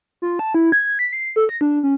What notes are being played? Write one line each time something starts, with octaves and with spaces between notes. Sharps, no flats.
F4
A5
E4
G#6
B6
C7
A4
A#6
D4
C#4